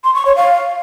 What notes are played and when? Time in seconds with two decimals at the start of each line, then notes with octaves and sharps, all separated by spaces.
0.04 C6
0.15 C#6
0.25 C#5
0.36 F5